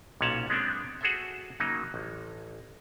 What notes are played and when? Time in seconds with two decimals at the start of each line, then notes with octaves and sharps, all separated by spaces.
0.21 B1 A#2 C#4 C#5 F#5 A5
0.50 G#3 B3 C4 D4
1.01 F#4 G#4 A4 C5 E5
1.60 C#3 F#3 A#3 D#4
1.94 A1